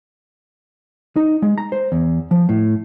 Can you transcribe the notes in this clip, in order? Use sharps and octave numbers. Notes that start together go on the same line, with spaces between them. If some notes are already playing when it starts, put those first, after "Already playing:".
D#4
G#3
A#5
C5
E2
F3
A2